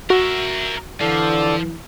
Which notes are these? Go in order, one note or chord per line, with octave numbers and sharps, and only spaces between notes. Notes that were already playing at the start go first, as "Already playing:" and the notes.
F#4 A#4 E5
D3 E3 F3 A4 D5